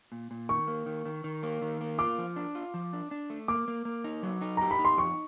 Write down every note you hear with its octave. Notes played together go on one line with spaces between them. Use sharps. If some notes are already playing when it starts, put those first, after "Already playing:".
A#2
A#2
D#3 C#6
A#3
D#3
D#3
D#3
A#3
D#3
A#3
F4 D6
F3
D4
F4
F3
D4
D4
A3
A#3 D6
A#3
A#3
D#4
F#3
D#4
G4 A#5
B5
D#4
C6
F2 C#6